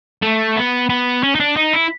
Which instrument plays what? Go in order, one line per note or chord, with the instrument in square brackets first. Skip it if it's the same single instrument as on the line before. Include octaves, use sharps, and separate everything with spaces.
[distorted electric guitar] A3
B3
B3
C#4
D#4
D4
D#4
E4